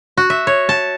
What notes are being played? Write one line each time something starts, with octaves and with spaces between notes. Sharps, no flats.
F#4
E5
C#5
A5